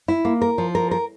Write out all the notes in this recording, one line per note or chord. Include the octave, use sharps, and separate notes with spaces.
E4
A#3
A#4
F3
A#4
A#4